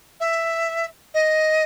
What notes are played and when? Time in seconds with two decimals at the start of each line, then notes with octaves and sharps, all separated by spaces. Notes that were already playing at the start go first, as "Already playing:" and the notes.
0.20 E5
1.14 D#5